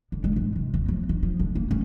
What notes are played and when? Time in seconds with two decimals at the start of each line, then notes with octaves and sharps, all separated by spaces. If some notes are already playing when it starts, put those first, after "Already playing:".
0.12 D3
0.24 G#3
0.36 G#1
0.56 C3
0.74 D#2
0.88 F3
1.09 D#3
1.23 F3
1.39 D3
1.55 A#3
1.71 C#4